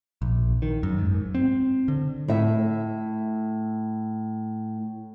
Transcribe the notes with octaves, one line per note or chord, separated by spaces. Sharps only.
A#1
D#3
F#2
G#2
C4
D3
A2 E5